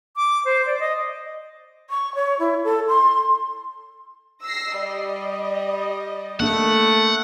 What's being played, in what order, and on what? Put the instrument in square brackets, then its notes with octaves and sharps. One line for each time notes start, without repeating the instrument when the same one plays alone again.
[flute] D6
C5
D5
D#5
[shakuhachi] C#6
C#5
E4
A4
C6
[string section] E6 A#6 C7
G3 D#5
[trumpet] A3 [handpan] A#3 D4 A4 [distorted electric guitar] F#5